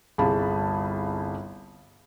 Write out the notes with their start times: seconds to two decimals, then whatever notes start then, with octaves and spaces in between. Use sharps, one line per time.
0.18 G1 C2 G#4 F5 A5 B5